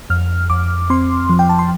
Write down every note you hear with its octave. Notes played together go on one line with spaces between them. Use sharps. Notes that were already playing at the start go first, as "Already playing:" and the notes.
F2 F6
F2 D6
C4 C6
F3
G5
A5
C6